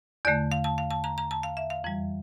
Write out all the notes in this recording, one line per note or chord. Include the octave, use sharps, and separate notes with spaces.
E2 D3 A3 D5
F5
A5
F5
A5
A#5
A#5
A5
F5
E5
F5
F2 E3 G3